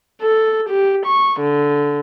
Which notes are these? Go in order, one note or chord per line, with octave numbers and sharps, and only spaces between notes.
A4
G4
C#6
D3